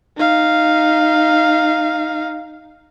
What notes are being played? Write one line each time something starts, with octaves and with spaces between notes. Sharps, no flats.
D#4 F5